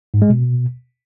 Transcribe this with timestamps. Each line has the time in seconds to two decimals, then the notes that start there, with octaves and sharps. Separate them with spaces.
0.14 G#2
0.22 G#3
0.30 B2